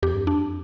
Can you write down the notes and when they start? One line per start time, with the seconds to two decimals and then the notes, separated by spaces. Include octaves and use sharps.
0.03 F2 G4
0.14 G2
0.26 F2 D4